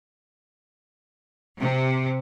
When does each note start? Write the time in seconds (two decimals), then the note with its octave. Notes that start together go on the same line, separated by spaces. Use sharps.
1.60 C3